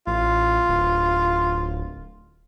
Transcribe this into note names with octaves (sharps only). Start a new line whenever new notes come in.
A1 F4
D1